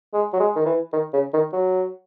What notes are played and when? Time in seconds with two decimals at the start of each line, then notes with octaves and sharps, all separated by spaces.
0.14 G#3
0.33 F#3
0.40 G#3
0.56 D#3
0.66 E3
0.93 D#3
1.13 C#3
1.34 D#3
1.53 F#3